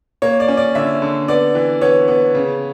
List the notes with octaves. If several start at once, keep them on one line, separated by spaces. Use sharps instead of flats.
A#3 C#5
D5
C#4
D5
D3 E5
D3
B3 D5
E3
B3 C#5
B3
C#3